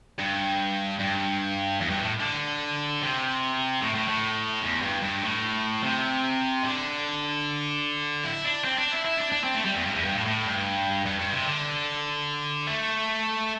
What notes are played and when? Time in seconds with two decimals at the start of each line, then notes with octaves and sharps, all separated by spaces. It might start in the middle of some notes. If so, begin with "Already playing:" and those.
0.19 G2
0.99 G2
1.81 E2
1.90 G2
2.01 A2
2.20 D3
3.02 C3
3.82 A2
3.95 A2
4.08 A2
4.62 E2
4.82 G2
5.02 G2
5.22 A2
5.83 C3
6.63 D3
8.24 E4
8.45 D4
8.64 C4
8.78 D4
8.92 E4
9.05 E4
9.17 D4
9.32 D4
9.44 C4
9.55 A3
9.65 G3
9.75 E2
9.86 G2
9.95 E2
10.05 G2
10.15 A2
10.26 A2
10.45 G2
11.06 G2
11.19 G2
11.32 C3
11.46 D3
12.67 A3